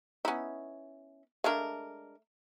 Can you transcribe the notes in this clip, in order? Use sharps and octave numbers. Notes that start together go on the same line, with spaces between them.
B3 C#4 D#4 E4
G#3 A3 D4 A#4 F5